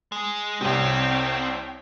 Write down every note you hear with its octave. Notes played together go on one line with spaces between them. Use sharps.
G#3
C2 C3 C4 C#5 G5